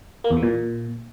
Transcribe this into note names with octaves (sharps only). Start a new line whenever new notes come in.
A#3
E2
E3
A#2